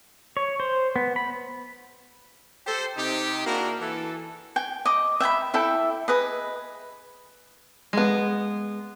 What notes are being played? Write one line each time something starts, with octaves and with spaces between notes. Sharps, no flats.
C#5
C5
B3
B5
G4 A4 C5
C3 D#4 G4
A#3 D4 E4 F#4 G#4 A#4
E3 A4
G5 G#5
D#5 D6
E5 G5 G#5 B5
E4 A4 E5 G5
G#4 B4 D#5
G#3 B3